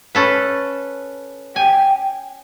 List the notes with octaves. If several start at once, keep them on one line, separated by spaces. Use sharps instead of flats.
C#4 A4 B4
G5 G#5